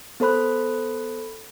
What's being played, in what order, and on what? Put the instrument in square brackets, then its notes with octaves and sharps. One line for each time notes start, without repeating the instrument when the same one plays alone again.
[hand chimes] B3 A4 C5 B5 F#6